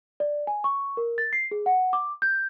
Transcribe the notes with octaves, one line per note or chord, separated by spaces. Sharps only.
D5
G#5
C#6
A#4
A6
C7
G#4
F#5
D6
G6